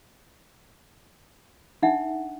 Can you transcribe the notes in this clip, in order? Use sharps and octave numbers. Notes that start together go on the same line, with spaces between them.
D4 D#4 E5 F#5